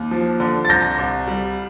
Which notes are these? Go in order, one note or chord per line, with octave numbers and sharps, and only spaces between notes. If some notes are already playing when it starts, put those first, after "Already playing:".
Already playing: D#2
F3
D3
A6
C2 G6 A#6
C2
G3